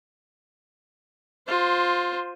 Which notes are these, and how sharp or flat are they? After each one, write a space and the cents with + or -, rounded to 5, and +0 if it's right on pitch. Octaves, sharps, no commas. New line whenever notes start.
F4 +15 C5 +0